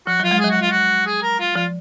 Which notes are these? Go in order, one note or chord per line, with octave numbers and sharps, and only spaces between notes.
F3 F#4
F#3 F4
G#3
F#3 G#4
F#4
F4
F#4
G#4
A#4
F4
F3 F4